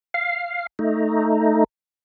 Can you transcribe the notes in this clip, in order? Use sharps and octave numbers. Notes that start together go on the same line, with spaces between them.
F5
A3 D#4